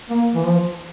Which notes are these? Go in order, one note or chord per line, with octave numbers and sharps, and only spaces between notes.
A#3
E3
F3